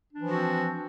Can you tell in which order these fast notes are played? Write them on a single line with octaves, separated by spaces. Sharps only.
D4 E3 F3 F#4 C4